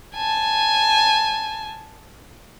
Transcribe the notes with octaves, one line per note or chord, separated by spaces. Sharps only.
G#5 A5